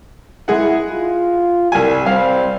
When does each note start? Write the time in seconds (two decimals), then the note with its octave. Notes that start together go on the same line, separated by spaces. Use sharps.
0.48 G#3 E4 G#4 F#5
0.91 F4
1.72 C2 G3 G#5
2.06 G3 C4 F5